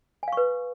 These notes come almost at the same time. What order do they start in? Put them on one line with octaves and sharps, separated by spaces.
G#5 F5 C#6 B4